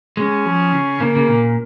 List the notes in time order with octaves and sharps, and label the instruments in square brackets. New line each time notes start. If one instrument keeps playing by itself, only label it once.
[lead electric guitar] G#3 [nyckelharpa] C#4
[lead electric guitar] F3
C#3
[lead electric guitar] C#3 [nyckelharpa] A#3
[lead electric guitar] C#3
A#2